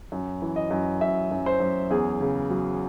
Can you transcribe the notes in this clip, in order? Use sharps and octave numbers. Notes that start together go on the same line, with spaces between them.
F#2
E3
D#5
F#2
F#2 E5
F#2
C5
F#2
E2 G#4
C#3
F#3